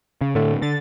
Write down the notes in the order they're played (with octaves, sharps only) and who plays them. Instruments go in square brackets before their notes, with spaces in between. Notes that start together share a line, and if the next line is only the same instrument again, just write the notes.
[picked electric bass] C#3
[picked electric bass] A2 D3 [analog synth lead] A3
[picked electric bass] D3 [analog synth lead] A6